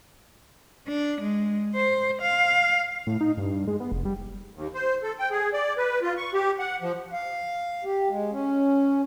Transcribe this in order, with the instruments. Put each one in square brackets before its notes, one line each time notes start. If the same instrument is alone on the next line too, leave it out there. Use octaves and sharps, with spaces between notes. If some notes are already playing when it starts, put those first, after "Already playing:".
[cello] D4
G#3
C5
F5
[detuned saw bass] A2
D#4
G2
G2
G#3
B3
F1
G3
[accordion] D#2
C5
A4
G5
G#4
D5
B4
F4
C#6
G4
F#5
F3
[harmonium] F5
G4
G#3
C#4